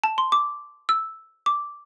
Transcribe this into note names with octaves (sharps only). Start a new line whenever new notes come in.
A5
C6
D6
E6
D6